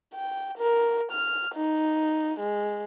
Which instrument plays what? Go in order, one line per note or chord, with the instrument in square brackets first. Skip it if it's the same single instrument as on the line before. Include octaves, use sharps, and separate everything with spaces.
[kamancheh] G5
A#4
F6
D#4
G#3